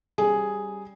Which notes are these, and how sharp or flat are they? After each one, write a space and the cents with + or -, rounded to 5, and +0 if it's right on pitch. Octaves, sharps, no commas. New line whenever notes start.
G3 +0 C#4 +0 G#4 +0